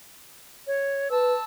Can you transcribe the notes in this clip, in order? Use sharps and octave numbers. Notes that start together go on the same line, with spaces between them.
C#5
B4 A5 E6